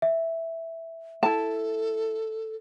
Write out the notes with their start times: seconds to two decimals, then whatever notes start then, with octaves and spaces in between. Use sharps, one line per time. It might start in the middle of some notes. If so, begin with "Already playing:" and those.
0.02 E5
1.23 E4 A4 A5